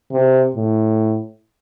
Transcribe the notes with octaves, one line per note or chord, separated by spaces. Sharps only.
C3
A2